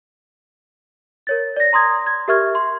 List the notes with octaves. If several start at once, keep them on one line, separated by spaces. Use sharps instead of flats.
A#4 C#5 A6
D5 A#6
A#5 C6 D#6 G#6
G#6
G4 A#4 E5 C#6 F6 G#6
C6